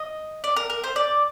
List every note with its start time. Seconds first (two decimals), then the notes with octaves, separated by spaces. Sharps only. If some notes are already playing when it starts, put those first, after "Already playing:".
Already playing: D#5
0.44 D5
0.56 A#4
0.70 A#4
0.84 C5
0.96 D5